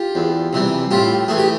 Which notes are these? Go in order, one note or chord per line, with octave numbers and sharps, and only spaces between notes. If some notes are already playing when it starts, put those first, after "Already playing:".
Already playing: F4 G4
E2
C3 E3 G3
A2 F4 G4
E3 A3 G#4
G4